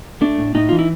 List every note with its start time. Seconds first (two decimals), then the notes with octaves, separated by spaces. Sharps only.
0.21 A3 D4
0.38 A2
0.55 A2 D#4
0.69 E3 F4
0.79 E4